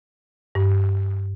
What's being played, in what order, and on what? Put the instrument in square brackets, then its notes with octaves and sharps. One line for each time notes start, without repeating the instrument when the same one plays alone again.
[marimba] G2